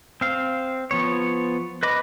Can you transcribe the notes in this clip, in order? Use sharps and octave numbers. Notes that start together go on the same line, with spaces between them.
C4 F5
F3 B3 C#5
B4 D#5 B5 D6